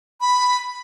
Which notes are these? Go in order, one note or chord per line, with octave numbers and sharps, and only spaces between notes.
B5